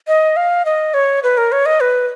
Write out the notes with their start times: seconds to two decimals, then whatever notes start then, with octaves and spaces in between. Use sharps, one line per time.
0.08 D#5
0.37 F5
0.65 D#5
0.94 C#5
1.23 B4
1.38 A#4
1.52 C#5
1.66 D#5
1.81 B4